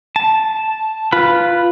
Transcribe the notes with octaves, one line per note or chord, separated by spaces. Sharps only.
A5
F4 B4 B5